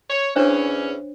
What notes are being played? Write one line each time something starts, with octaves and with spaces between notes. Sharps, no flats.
C#5
E2 C#4 D4 C5 C#5